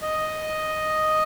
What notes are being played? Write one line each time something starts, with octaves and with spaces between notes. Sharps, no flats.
D#5